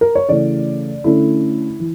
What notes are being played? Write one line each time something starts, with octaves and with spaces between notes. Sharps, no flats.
A#4
C#5
C#3 E3 A3 C#4 D5
D3 A3 C#4 E4
E3